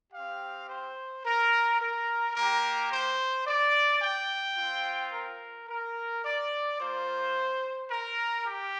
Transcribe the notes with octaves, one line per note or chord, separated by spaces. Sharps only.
C4 G4 F5
C5
A#4
A#4
A#3 G4 A#4
C5
D5
G5
C4 F4
A#4
A#4
D5
A#3 F4 C5
A#4
G4